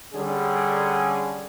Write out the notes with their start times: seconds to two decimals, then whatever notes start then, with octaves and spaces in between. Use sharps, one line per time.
0.13 D3 G3 C#4 G#4